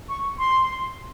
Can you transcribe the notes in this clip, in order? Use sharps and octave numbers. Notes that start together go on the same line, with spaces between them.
C#6
C6